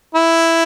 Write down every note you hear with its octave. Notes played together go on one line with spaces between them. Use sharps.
E4